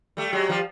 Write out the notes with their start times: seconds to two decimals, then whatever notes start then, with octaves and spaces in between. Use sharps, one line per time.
0.17 G3 A3
0.33 F#3 G#3
0.49 F3 G3